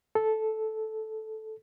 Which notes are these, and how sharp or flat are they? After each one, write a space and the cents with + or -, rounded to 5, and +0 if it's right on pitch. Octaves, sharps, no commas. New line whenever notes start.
A4 -10